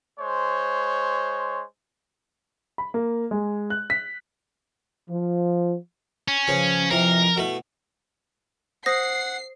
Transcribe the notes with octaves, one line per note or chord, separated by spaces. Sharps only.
G#3 C5 C#5
B5
A#3
G#3
F#6
B6
F3
C#4
C#3 F3 B4
F2 C3 E3 A#4
B2 A3 E4
C5 F#5 D#6 A#6 C7